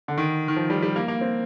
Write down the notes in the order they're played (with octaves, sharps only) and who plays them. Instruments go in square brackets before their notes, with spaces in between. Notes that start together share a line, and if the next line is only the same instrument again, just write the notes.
[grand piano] D3
D#3
D#3
F3
G3
G3
A#3
A#3
C4